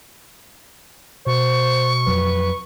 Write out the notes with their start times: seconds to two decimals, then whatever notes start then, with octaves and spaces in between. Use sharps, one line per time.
1.26 B2 C5 C#6
2.07 F2 F#3 B4